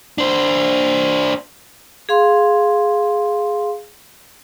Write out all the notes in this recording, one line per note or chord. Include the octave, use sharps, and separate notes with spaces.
D4 C5
G#4 F5 C6